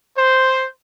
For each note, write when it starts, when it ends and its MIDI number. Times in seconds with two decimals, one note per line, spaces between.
0.16 0.68 72